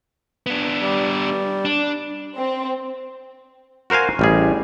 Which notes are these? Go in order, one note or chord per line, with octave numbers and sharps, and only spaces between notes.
B3 D4
G3
D4
C4
F#4 A#4 C5 F5 G#5
A1 G3 G#4